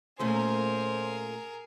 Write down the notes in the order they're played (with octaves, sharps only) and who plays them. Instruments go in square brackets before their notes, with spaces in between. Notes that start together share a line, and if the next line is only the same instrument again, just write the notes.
[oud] A#2 A3 C#4 [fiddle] G#4 A#4 [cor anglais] C5